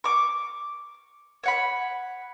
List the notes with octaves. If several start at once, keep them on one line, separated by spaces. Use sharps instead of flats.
C#6 D6
C#5 F#5 B5